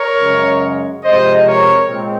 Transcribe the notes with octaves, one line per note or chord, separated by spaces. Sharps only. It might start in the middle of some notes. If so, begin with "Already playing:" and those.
Already playing: A#4 C#5
F#2 C#3 G#3
C3 F3 G#3 C5 D#5
A#4 C#5
A#2 G#3 C4